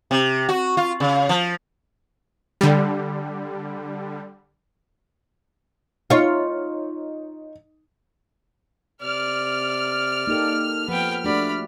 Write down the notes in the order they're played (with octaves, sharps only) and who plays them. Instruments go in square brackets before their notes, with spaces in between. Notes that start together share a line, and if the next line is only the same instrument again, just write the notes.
[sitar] C3
F#4
F4
C#3
F3
[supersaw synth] D3 G3
[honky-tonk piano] D#4 [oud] F4 C#5
[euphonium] C3 [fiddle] D5 [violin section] F6
[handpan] A#3 G4 A4 [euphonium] D#4
[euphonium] F2 [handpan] F3 [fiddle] B3 G5
[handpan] A3 F#4 G4 [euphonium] D4 [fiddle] D5 B5